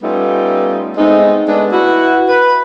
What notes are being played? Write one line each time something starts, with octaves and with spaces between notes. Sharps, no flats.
G3 A3 B3 C#4 D#4 F4
G#3 A3 B3 C4 D#4
G#3 A3 B3 D4
E4 F#4 B4
B4